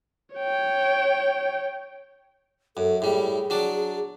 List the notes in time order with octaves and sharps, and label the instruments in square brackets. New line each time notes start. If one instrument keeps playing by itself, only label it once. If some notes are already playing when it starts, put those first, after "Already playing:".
[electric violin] C#5 G5
[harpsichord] F#2 [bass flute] A4
[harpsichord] A2 G3 [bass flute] G#4
[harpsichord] F#3 D4 D5